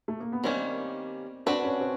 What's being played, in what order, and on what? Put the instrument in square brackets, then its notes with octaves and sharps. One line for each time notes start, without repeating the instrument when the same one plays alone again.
[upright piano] A3
A#3
B3
[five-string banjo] D#3 G3 A#3 C#4 [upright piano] C4
[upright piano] C4 [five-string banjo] D4 F#4 B4
[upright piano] C#4
C4